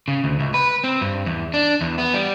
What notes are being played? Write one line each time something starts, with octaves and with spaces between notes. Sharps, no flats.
C#3
D2
C#2
B4
C4
G2
E2
D4
E2
B3
G3